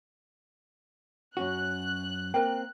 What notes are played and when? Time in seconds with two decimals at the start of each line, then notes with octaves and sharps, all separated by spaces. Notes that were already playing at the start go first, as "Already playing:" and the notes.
1.37 F#2 C#4 F#4 F#6
2.34 A#3 C4 A#4 G5